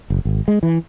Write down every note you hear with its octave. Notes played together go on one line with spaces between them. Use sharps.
F#1
G#1
G#3
E3